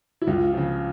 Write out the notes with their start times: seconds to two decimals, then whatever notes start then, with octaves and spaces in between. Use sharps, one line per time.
0.22 E4
0.27 C#2 F4
0.53 C#3 F3